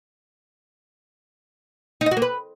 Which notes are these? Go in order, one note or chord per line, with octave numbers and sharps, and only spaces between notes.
D#4
D#5
F#4
A#3
B4